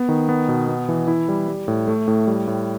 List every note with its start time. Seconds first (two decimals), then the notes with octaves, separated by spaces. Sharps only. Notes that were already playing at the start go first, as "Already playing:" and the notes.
Already playing: B3
0.09 D#3
0.29 B3
0.49 B2
0.68 B3
0.89 E3
1.08 E4
1.28 G3
1.48 G3
1.68 A2
1.88 A3
2.08 A2
2.27 G3
2.47 A2